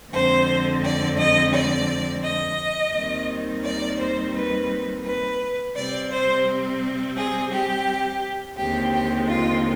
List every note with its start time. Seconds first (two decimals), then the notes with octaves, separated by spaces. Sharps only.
0.11 F2 D3 G#3 C4 C5
0.83 D5
1.17 D#5
1.52 D5
2.23 D#5
2.94 D#2 D#3 G3 C4
3.64 D5
3.99 C5
4.34 B4
5.05 B4
5.75 C3 G3 C4 D5
6.11 C5
7.16 G#4
7.51 G4
8.57 D#2 D3 G#3 C4 G4
8.92 G4
9.28 F4